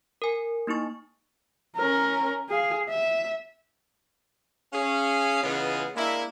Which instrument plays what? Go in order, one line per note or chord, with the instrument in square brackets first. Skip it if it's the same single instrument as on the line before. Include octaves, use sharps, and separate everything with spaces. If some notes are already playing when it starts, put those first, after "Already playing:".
[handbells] A#4 G#5
A#3 D#4 E4 C#6
[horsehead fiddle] C#4 A#4
G#4 F5
E5
[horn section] C#4 G#4 F5
C#3 E3 G#3 B3 F4 G#4
G#3 A#3 D4 E4